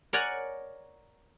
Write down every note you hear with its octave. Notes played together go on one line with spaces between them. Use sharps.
A#4 C#5 D5 F#5 G#5 A#5